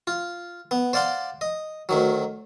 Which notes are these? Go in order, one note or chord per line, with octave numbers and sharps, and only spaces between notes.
F4
B3
C5 D5 F5 F#5 C6
D#5
D2 D#3 F#3